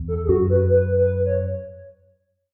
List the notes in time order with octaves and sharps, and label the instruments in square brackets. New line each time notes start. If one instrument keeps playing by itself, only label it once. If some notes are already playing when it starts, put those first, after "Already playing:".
Already playing: [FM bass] E2
[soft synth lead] A4
G#4
[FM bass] F#2 [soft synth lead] F#4
[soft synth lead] B4
B4
B4
C#5